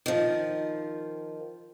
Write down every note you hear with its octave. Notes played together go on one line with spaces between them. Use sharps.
D#3 F3